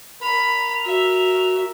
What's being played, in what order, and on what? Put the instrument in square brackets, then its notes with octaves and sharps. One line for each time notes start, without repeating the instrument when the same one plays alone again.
[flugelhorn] A#4 [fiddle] B5 [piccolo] F7
[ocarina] F#4 [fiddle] E5